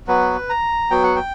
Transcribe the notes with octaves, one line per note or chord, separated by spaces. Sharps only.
F#3 B3 F#4 B4
A#5
F#3 B3 F#4 G5
F#5
G5